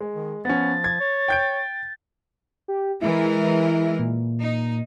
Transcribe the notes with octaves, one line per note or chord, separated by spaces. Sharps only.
G#3
D#3
F3 B3 C#4 A6
G#6
C#5
G5 G6 D7
G4
E3 G#3 E4 A#4
A#2
D#4